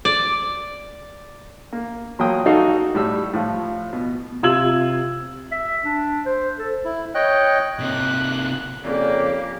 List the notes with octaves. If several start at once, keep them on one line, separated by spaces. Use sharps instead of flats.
D5
A#3
A#1 F#3 A#3 G5 D#6
D#4 F#4 A4 D#5 F5
A2 G3 E6
A2 F3
B2
C3 F4 E6 G#6 F#7
E5
D4
C5
A4
E4
C#5 D#5 G5 F#6
C3 A#3 F#6
F2 C#3 A#3 G4 D5